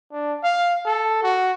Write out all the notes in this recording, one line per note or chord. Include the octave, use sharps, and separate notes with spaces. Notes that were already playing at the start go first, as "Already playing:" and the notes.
D4
F5
A4
F#4